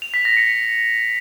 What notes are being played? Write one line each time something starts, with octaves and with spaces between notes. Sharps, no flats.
F7
B6
A#6
C#7